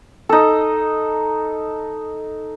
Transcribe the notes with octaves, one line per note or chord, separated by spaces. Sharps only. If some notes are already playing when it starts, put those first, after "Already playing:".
D#4 A4